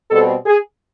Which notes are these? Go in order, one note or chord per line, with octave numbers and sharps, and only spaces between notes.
B2 G3 C4 A4
G#4